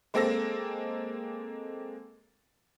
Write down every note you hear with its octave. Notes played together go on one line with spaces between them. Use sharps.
G#3 A#3 C4 A4 E6 A#6